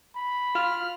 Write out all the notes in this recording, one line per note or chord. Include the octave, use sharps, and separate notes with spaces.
B5
F4 F6